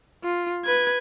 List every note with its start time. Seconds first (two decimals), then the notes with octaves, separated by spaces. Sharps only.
0.24 F4
0.65 B4 G#6